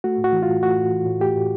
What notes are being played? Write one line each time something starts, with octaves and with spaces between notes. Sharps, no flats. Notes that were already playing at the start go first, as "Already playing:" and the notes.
A3 F#4
A2
F#4
E3
F4
A2
A3 F#4
A2
E3
A2
A3 G4
A2